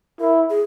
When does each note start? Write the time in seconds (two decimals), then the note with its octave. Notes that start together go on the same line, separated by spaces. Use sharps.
0.20 E4 A#4
0.50 G#4